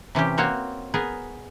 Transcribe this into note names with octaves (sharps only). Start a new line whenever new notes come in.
C3 E3 C#4 G4
A#3 C4 F#4 C#5
B3 G#4 A#4